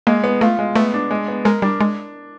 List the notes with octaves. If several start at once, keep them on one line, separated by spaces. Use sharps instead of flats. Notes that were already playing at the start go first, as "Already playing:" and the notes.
G#3 A#3
B3
A3 F4
G#3
A3 B3
D4
G#3
B3
G#3 A#4
G3 D4
G#3 D4